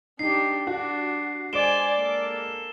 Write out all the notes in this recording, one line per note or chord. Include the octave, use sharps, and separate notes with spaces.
D4 D#4 G4 C7
D4 F#4
G#3 C5 D5 D#5 G#5 D7 E7 G7
A#3 A4